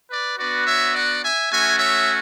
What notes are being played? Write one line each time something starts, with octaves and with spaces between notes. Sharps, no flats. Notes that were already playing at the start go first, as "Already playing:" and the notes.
B4 D5
B3 D4 F#4 B4 D5
C#5 E5
D5 F#5
E5 G#5
A3 C#4 F#4 E5 G#5
C#5 E5